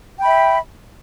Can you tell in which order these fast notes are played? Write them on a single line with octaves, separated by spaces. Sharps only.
G5 B5 E5